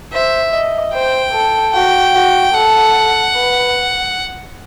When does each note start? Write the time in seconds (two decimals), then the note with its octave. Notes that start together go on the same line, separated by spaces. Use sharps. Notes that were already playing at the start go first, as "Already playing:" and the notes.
0.13 C5 E5
0.53 D#5
0.94 C5 G5
1.33 A4
1.74 F#4 G5
2.15 F#4
2.54 A4 F#5
3.35 B4